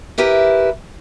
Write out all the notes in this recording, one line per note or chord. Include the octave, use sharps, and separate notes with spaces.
E4 G4 A#4 B4